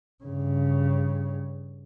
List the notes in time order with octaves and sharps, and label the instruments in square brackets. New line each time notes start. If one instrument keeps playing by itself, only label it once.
[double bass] G2 C#3